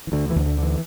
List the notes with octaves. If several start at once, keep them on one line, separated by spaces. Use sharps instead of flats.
E3
D2 D3
E3
D2
D3
D3 E3